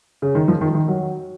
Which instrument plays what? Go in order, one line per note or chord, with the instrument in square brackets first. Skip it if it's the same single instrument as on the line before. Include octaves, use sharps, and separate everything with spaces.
[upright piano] C#3
D#3
F3
D#3
D#3
F#3